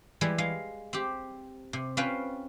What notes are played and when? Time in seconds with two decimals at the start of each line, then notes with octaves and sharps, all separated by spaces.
0.21 E3 G3 G#3 E4
0.38 G#3 F5
0.93 C4 G4
1.73 C3
1.97 C4 C#4 F4 B4 F5 G5